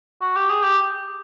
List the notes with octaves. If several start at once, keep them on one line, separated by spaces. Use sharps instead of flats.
F#4
G4
G#4
G4